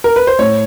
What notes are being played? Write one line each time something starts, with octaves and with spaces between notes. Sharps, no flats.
A#4
B4
C5
A2 C#5